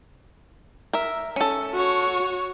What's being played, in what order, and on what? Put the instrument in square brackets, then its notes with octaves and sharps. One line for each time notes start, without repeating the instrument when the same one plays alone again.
[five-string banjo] A#4 E5
C#4 A4
[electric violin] F#4 C#5